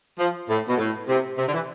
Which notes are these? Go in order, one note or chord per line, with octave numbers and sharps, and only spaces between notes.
F3
A2
B2
A2
C3
C3
D3
E3